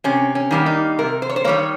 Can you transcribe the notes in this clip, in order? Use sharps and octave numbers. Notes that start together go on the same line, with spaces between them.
C3 C#4
C#4
D#3 G3 A#3
D#4
C3 A#4
C5
C#5
C5
D#3 G3 A#3 C#5